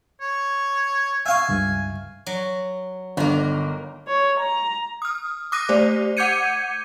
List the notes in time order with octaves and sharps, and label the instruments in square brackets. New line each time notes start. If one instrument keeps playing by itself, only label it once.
[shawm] C#5
[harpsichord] E5 F5 C#6 [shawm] G#5
[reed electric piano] C#2 G2
[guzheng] F#3
[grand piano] G1 [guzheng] D#3 A#3
[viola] C#5
A#5
[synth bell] D#6 F6
D6 D#6 F#6 A#6 D#7
A3 G4 C5 D5
F#5 D6 G6 G#6 C#7 D#7